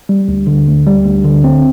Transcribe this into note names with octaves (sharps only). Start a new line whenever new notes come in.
G3
D2
D3
D2
G3
D2
D3
C4